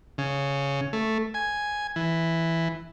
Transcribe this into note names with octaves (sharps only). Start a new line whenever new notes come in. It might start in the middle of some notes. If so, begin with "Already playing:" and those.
C#3
A3
G#5
E3